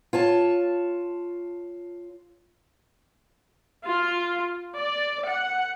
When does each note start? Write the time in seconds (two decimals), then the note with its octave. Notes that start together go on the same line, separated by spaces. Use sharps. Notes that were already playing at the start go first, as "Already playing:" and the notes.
0.13 F4 C#5 A5
3.85 F4
4.77 D5
5.28 F#5